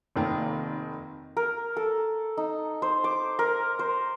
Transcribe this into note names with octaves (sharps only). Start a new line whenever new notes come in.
F1 D#3 A#3
A#4
A4
D#4
C5
D6
A#4
C5